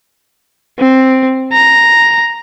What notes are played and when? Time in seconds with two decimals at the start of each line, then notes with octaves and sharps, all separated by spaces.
0.79 C4
1.53 A#5